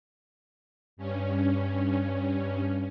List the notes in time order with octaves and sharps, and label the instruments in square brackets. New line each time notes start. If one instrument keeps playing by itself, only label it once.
[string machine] G2 C#4